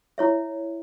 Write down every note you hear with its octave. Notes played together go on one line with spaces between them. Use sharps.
E4 C#5 E5